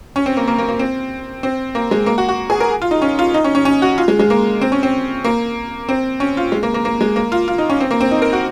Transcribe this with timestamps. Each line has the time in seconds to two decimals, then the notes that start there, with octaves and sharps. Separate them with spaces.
0.16 C#4
0.26 C4
0.37 A#3
0.48 A#3
0.58 A#3
0.69 A#3
0.79 C4
1.43 C4
1.75 A#3
1.91 G#3
2.06 A#3
2.18 F#4
2.28 F#4
2.50 G#4
2.60 A#4
2.82 F4
2.91 D#4
3.02 C#4
3.19 F4
3.34 D#4
3.44 C#4
3.55 C#4
3.65 C#4
3.82 F#4
3.98 F4
4.08 G#3
4.20 G#3
4.30 A#3
4.61 C4
4.72 C#4
4.83 C4
5.25 A#3
5.89 C4
6.20 C#4
6.37 F4
6.52 G#3
6.63 A#3
6.74 A#3
6.85 A#3
7.01 G#3
7.16 A#3
7.32 F4
7.48 F4
7.58 D#4
7.70 C#4
7.80 C4
7.91 A#3
8.01 C4
8.11 D#4
8.22 A#4
8.33 F#4